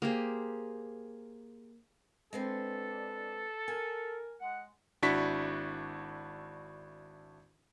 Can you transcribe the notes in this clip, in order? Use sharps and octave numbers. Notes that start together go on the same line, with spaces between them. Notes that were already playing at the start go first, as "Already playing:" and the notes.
A#3 G4 G#4 C5
G#3 B3 C4 D4 A4
A#4 G#5
G#3 F#5
G#1 D4 E4 F#4 C#6 B6